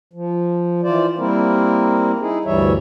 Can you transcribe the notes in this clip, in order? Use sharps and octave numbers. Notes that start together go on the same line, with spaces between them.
F3
E3 F4 C5 D5
G3 A#3 C4 E4 A#4
D#4 E4 G#4
D2 G2 E3 G3 C#5 E5